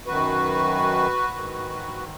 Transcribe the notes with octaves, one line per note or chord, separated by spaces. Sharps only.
F#2 D#3 F#4 B4
G#2 D#3